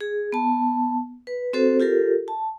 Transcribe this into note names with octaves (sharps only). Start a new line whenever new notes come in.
G#4
B3 A5
B4
C4 F#4 A4 C5
F4 G4 A4 A#4
A5